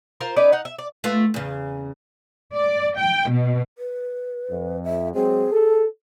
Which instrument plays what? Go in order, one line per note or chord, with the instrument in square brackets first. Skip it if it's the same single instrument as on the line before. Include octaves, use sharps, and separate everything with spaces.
[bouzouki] F4 A#4 C5
C#4 D#4 B4 D5
D#4 F#5
E5
D5
[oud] A3 B3 F4
E2 C#3
[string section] D5
G5
B2
[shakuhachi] B4
[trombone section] F2
[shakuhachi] E5
[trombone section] F#3 G#3 C4 [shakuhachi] G#4
[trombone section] A4